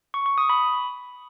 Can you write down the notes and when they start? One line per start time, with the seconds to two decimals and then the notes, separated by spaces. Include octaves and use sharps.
0.14 C#6
0.26 C#6
0.38 D#6
0.49 B5